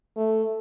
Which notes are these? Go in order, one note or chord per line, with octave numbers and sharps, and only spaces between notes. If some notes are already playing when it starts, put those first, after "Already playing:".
A3